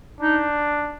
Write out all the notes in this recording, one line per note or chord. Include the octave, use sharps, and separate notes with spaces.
D4 D#4